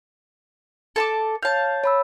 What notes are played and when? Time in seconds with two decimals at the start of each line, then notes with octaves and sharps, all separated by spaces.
0.96 A4 A5 D6
1.43 C#5 F5 A5 G6
1.84 C#5 B5 E6